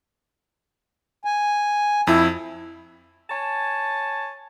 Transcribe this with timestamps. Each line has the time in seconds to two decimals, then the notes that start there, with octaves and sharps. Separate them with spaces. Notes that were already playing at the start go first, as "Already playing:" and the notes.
1.25 G#5
2.07 F2 E4
3.30 C#5 G#5 A5